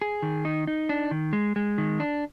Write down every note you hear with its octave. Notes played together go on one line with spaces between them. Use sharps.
G#4
D#3
D#4
D#4
D4
D#3
G#3
G#3
D#3
D4